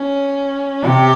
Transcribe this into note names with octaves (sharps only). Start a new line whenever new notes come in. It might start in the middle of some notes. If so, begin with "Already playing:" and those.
Already playing: C#4
C3 G4